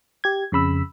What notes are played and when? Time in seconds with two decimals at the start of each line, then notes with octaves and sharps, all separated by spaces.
0.24 G4 G#6
0.52 F2 C#3 B5 E6